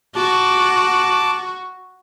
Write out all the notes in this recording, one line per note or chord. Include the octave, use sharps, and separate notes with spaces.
F#4 A5 D6